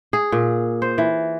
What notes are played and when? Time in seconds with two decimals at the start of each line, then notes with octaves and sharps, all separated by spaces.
0.13 G#4
0.32 A#2
0.82 C5
0.98 E3